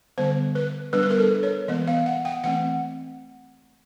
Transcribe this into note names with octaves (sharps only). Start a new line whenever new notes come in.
D3 G3 B3 C5
B4
G3 B3 D4 B4
B4
A#4
A4
C#5
E3 G#3 B3 D#5
F5
F#5
G5
E3 A3 C4 F#5